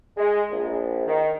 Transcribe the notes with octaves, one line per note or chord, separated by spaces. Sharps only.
G#3
A#1
D#3